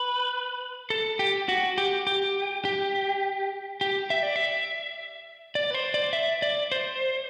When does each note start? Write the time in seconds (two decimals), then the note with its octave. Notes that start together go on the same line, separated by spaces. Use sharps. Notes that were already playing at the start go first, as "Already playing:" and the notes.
Already playing: B4
0.90 A4
1.19 G4
1.49 F#4
1.78 G4
2.07 G4
2.65 G4
3.81 G4
4.10 E5
4.23 D5
4.36 E5
5.55 D5
5.70 B4
5.74 C5
5.94 D5
6.13 E5
6.42 D5
6.72 C5